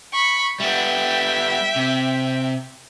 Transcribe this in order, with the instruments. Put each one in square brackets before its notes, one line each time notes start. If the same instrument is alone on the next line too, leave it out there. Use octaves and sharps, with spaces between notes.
[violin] B5 C#6
[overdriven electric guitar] G3 B3 [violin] E5 G5
[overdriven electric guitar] C3